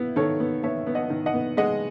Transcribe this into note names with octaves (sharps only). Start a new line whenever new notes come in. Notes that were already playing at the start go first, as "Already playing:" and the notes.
Already playing: B3 E4
D#3 A4 C#5
B3
B3 C#5 E5
B3
D#5 F#5
D#3
D#5 F#5
B3
G#3 D#5 F#5